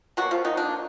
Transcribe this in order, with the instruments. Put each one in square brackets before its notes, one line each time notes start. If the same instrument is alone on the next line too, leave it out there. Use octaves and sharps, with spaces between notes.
[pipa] B2 F#3 A#3 F#4
F3 F4
D#3 D#4
B2 A#3 D4